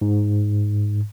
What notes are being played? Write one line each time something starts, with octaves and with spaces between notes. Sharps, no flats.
G#2